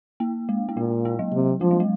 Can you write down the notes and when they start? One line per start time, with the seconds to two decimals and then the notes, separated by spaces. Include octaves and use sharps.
0.20 A#3
0.49 G#3
0.69 A#3
0.76 A#2 G#3
1.05 A#3
1.19 F#3
1.33 C3
1.61 F3 G#3
1.71 F#3
1.80 G#3